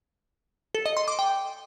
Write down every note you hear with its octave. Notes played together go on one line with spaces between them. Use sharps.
A4
D#5
C6
D6
G5